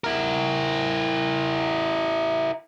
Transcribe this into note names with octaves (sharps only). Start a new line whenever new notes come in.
E4 A#4